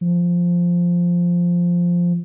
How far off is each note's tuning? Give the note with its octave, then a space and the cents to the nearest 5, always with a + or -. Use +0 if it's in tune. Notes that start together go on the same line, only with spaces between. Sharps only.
F3 +0